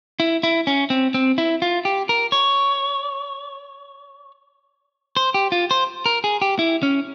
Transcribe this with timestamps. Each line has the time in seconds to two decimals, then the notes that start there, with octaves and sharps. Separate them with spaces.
0.20 E4
0.43 E4
0.67 C#4
0.90 C4
1.14 C4
1.38 E4
1.62 F4
1.85 G4
2.09 A#4
2.32 C#5
5.17 C5
5.34 G4
5.52 F4
5.71 C5
6.06 A#4
6.24 G#4
6.42 G4
6.59 E4
6.83 C#4